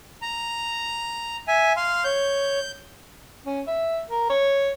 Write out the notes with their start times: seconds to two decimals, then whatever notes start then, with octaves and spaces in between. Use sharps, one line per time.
0.22 A#5
1.48 E5 G#5
1.77 F5 C6
2.04 C#5 G6
3.46 C#4
3.68 E5
4.10 A#4
4.30 C#5